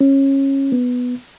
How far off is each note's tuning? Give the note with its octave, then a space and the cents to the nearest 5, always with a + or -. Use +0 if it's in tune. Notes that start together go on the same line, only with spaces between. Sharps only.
C#4 -20
B3 +0